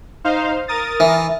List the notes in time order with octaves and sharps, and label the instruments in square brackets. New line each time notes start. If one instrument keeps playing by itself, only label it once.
[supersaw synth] D#4 C5 F5
A#4 D#6 A6
[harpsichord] E3